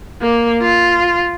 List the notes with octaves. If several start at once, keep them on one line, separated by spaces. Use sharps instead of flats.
A#3
F4